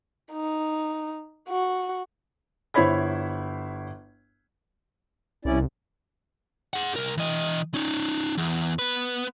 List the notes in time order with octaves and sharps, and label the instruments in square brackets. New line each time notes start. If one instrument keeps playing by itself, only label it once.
[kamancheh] D#4
F#4
[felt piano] G1 E4 C5 C#5 B5 G#6
[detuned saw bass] C2 [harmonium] C#4 E4 D5
[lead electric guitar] G#4 F#5
C2 A#4
E3 D#5
C#4 D#4
E2
B3 B4